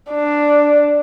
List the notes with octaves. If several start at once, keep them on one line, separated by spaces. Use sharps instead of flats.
D4